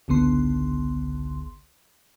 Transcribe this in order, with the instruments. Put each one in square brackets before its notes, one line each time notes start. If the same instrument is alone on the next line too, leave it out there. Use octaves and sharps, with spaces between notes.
[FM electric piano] G#1 C#2 D3 B3 C6